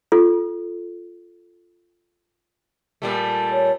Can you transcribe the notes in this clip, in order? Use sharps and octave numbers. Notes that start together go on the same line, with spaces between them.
F4 A4
A#2 G3 A3
C#5